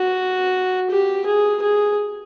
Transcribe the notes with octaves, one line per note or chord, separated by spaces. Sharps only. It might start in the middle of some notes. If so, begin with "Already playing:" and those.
Already playing: F#4
G4
G#4
G#4